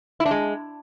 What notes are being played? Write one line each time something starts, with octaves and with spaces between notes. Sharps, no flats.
E4
D4
G#3